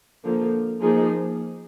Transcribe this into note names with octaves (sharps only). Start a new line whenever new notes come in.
D3 F3 A#3
F3 A#3 D#4 G#4